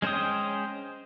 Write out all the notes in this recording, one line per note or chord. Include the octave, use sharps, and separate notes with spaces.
G#3 C#4 C5 G5 D#6